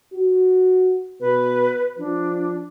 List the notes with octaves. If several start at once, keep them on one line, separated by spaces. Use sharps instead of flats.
F#4
B2 B4
F3 D4